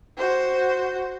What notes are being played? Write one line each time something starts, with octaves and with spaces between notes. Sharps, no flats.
F#4 C5